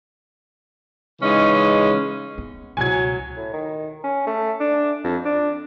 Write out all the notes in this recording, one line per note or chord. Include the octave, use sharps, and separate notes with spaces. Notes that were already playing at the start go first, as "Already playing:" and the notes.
C#3 E3 G#3 C#4 D#4
B3
C#2 B2 F#3 G#5 G#6
A2
D#3
C#4
A3
D4
F2
D4